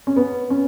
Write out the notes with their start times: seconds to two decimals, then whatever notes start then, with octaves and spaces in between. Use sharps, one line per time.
0.07 C#4
0.16 B3
0.50 C#4